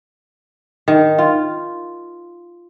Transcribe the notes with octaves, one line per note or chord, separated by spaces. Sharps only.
D#3
F4